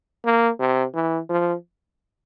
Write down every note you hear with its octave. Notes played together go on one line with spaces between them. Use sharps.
A#3
C3
E3
F3